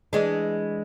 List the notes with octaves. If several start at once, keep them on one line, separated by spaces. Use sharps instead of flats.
E3 G#3 D4